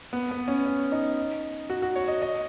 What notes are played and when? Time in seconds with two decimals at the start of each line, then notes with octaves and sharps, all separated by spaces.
0.13 B3
0.31 B3
0.48 C#4
0.66 C#4
0.92 D#4
1.70 F#4
1.82 F#4
1.96 C#5
2.08 D#5
2.22 D#5